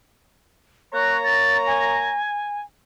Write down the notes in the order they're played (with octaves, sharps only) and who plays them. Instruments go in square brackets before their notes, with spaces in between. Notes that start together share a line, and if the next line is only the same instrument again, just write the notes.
[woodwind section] A#3 C#5 A#5 [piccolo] F#6
[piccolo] A6
G#5